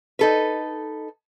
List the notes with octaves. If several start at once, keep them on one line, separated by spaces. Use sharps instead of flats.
D#4 A4 B4